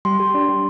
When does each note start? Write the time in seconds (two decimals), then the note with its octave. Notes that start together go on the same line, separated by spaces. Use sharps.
0.05 G3 C6
0.20 G4
0.34 D4
0.49 G3